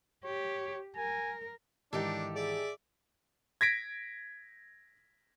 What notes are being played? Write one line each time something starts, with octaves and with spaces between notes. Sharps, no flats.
G4 C#5
A#4 G#5
G#2 D#3 E3 D4 D#4 G4 A4
G#4 D5 E5
G#6 A#6 B6 D7